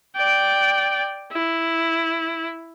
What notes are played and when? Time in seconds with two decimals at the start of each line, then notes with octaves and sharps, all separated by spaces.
0.16 D5 G5
1.32 E4